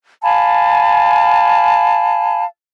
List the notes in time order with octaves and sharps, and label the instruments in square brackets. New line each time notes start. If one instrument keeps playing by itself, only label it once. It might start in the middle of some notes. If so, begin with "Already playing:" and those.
[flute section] F5 G#5 A5 B5